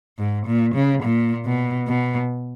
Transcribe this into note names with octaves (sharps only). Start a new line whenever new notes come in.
G#2
A#2
C#3
A#2
B2
B2